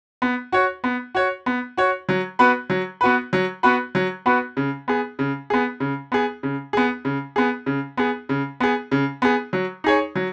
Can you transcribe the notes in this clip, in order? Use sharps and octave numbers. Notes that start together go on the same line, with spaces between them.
B3
F#4 C#5
B3
F#4 C#5
B3
F#4 C#5
F#3
B3 F#4 B4
F#3
B3 F#4 B4
F#3
B3 F#4 B4
F#3
B3 F#4 B4
C#3
B3 G#4
C#3
B3 G#4
C#3
B3 G#4
C#3
B3 G#4
C#3
B3 G#4
C#3
B3 G#4
C#3
B3 G#4
C#3
B3 G#4
F#3
D#4 G#4 C#5
F#3